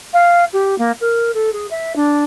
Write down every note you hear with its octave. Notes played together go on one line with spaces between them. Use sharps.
F5
G4
A#3
A#4
A4
G#4
E5
D4